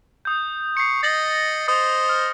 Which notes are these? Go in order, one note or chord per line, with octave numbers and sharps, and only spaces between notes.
D#6 G6
C#6 C7 C#7
D#5 A6 A#6 F#7
C5 D#5 D#6
F6